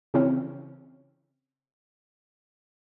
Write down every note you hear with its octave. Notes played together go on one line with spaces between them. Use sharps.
C#3 E3 C4 C#4